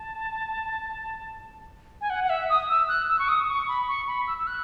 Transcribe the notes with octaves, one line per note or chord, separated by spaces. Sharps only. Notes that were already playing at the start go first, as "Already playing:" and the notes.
Already playing: A5
G#5
F#5
F#5
E5
D#6
E6
F#6
E6
C#6
D#6
C#6
B5
C#6
B5
E6
E6
F#6